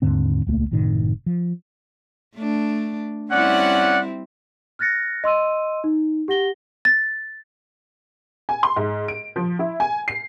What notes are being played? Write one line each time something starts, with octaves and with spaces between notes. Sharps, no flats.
D#2 G#2 D3 C4
D#1 C#2 A3 A#3
F#1 A2 C3 D#3
F3
A3 D4
G3 C4 C#4 E4 D5 F#5
F6 F#6 A6 A#6 C#7
D#5 C6 E6 D#7
D#4
G4 F#5 A#6 G7
A6
G#5
C6
G#2
D7
F3
E4
G#5
C7